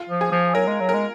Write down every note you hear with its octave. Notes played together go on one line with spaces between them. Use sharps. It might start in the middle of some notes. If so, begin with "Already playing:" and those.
Already playing: F4
F3
G#4
F3
F#3 A#4
G#3
F#3
G#3 A#4